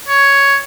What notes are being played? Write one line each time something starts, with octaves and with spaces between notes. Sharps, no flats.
C#5